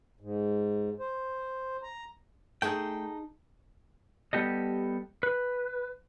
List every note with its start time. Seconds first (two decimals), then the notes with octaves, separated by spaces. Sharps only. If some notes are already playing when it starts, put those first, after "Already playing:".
0.21 G#2
0.99 C5
1.83 A#5
2.62 A3 D#4 G#4 G5 A5
4.33 G3 B3 G4 A4 D#5
5.23 B4